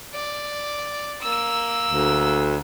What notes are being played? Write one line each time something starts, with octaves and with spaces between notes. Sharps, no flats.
D5
A#3 E6
D2